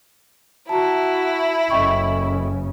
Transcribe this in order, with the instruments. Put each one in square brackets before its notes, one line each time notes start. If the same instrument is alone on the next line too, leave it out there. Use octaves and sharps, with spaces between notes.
[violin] E4 [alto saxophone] F#4 [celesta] A5 A#5
[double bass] F#1 C#3 [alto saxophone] A4 [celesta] D#5 G5 C#6